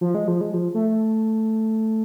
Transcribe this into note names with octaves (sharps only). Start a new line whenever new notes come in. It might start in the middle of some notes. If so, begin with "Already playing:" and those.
F3
G#3
F3
G#3
F3
A3